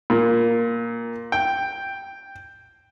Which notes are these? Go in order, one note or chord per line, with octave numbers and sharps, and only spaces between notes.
A#2
G5